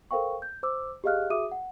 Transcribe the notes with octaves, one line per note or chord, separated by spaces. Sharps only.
A4 A#4 C5 F5 G5 C#6
G6
C5 D6 E6
G4 G#4 D#5 F5 F6 F#6
F#4 G#4 E5 D6 D#6 D#7
F#5